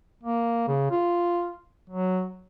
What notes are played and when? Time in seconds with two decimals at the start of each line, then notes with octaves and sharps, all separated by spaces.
0.23 A#3
0.68 C#3
0.91 F4
1.90 F#3